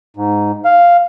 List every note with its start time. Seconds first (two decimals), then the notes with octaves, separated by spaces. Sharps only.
0.17 G#2
0.65 F5